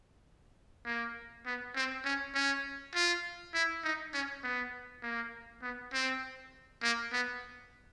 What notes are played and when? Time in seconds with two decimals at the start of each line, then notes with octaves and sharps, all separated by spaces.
0.86 A#3
1.46 B3
1.76 C4
2.05 C#4
2.34 C#4
2.95 F4
3.54 E4
3.84 D#4
4.13 C#4
4.44 B3
5.03 A#3
5.62 B3
5.93 C4
6.83 A#3
7.12 B3